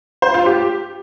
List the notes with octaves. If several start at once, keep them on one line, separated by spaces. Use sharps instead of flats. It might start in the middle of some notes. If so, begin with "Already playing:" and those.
C5
F4
G4